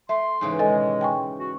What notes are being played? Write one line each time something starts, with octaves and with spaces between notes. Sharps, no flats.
A3 E5 C6
G#2 C#3 E3
B2 D#3 G#3 A4 D#5 G#5
G5 G#5 C#6
F#4